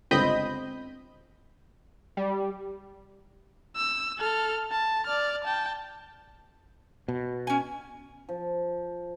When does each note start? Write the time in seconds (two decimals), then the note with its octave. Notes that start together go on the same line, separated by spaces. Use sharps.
0.11 G1 C#2 C4 D#5 B5 G6
2.17 G3
3.76 E6
4.18 A4 F6
4.71 A5
5.07 D5 F6
5.44 G5 A5
7.08 B2
7.47 C#4 G#5
8.29 F3